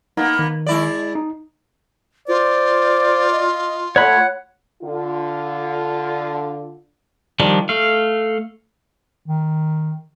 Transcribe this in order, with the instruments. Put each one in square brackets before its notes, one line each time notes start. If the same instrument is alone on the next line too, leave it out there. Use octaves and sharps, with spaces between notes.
[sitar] A#3 B3 [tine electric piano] D#4
[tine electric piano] D#3
[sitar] G#3 E4 D5
[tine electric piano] D#4
[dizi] F4 [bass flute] C5 [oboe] D5
[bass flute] D#5
[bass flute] A3 [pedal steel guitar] C#5 B5 [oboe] F#5
[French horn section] D3 F4
[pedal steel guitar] D#3 F3 G3 D4
A3 F5
[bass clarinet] D#3